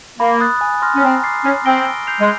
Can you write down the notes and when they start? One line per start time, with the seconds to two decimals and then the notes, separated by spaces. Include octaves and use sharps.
0.19 A#3 B5
0.40 D#6 F#6 A6
0.61 G#5
0.82 C6 F6 A#6
0.96 C#4
1.03 C4 A#5
1.23 D6 F6 A6 C7
1.44 C#4 F6
1.65 C4 A#6 D7 G7
1.86 E6
2.07 G6 C7 F7
2.20 G#3